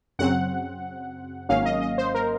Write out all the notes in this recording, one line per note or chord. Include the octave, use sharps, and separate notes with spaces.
F#2 C#3 F#3 C4 F#5
G#1 G#2 F#3 A#3 C#4 F5
D#5
D#5
C5
A#4